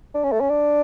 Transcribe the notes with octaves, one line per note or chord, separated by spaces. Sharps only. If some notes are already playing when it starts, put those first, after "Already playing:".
D4
C#4
A3
C#4
D4